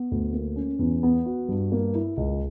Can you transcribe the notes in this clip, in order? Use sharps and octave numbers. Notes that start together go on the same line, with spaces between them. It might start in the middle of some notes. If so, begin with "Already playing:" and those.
Already playing: B3
D2
A#3
C#4
E2
B3
F#4
G2
A#3
E4
C#2